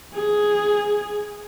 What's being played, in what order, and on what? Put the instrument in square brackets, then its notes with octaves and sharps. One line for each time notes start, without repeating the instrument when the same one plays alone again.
[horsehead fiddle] G#4